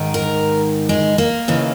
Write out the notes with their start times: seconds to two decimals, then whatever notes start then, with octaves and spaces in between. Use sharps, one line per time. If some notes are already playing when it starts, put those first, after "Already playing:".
Already playing: G#2 D#3
0.14 A#4
0.89 G#3
1.18 A#3
1.48 D#2 C#3 E3